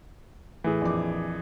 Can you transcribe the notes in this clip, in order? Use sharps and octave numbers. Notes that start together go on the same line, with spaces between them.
A2 E3 G#4
A#1 F2 D6